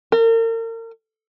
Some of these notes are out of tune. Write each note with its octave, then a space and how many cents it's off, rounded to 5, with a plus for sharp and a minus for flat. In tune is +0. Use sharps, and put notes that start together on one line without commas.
A#4 -40